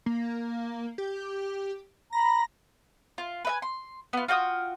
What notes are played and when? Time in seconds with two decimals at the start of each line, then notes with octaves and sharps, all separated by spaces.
0.06 A#3
0.98 G4
2.13 A#5 B5 A#6
3.18 F4
3.45 B4 E5 G#5
3.62 C6
4.13 B3 F4
4.28 F4 F#4 G5 D#6